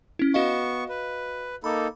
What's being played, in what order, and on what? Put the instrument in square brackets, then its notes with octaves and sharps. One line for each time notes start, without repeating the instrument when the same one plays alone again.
[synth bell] C#4 E4
[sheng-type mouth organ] B3 C#6 [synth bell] F#4 D#5 F5
[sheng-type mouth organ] B4
[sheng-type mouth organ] A#3 D#4 A4 [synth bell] B5 D6